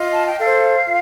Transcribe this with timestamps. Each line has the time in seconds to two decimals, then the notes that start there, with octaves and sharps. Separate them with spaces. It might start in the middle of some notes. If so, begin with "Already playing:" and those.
Already playing: F4 D#5
0.12 A5
0.25 G5
0.39 A4 C5 F5
0.86 F4